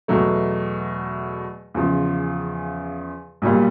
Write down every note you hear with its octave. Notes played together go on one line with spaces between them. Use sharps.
E2 B2 F#3 A3
E2 C#3 F3
B1 A#2 G3